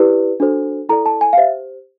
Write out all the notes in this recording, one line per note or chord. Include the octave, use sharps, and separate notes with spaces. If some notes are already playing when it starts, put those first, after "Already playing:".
Already playing: E4 G4 B4 D5
D4 F#4 A4 C5
E4 A4 D5 A#5
A5
G#5
F5
G4 C5 E5